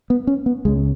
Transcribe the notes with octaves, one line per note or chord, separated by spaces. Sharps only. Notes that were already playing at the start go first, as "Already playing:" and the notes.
B3
C#4
B3
C#2 C#3 G#3